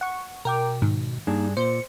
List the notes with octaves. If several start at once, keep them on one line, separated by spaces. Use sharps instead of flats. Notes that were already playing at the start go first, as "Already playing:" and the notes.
F#5 C#6
B2 A#4 G5 D6
G#2 D#3
G2 A#3 D4 D#4 G#4
A#2 C5 C#7